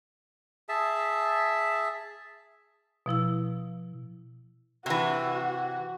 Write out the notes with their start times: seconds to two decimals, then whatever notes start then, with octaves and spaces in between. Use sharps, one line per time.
0.69 G#4 E5 A5
3.06 B2 F3 E4 E6
4.86 C3 E3 F#4